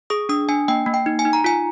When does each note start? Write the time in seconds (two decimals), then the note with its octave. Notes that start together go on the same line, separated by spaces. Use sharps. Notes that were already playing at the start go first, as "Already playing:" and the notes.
0.10 G#4 D#6
0.29 D4 D#6
0.48 D4 G#5
0.68 A#3 G5
0.86 A#3
0.94 G5
1.06 D#4
1.19 G#5
1.25 D#4
1.33 A#5
1.44 F4 G#5